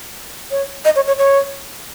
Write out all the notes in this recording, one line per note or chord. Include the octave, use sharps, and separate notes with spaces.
C#5
D#5
C#5
C#5
C#5